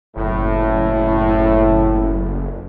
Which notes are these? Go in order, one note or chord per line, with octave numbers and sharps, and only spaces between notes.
F#1 A2 E4